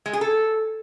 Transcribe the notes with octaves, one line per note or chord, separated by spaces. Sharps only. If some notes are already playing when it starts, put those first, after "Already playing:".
G#3
G#4
A4